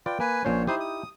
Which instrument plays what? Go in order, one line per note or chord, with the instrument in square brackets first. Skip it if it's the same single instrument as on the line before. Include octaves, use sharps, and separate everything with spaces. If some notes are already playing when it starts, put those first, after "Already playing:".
[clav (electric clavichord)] F4 B4 D5 [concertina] G5
[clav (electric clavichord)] A#3 [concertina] B4 G#5
[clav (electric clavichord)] A#1 A#2 C#4 [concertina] C5 C#5
[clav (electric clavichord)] D#4 E4 G4 [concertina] C5 D#6
[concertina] D#6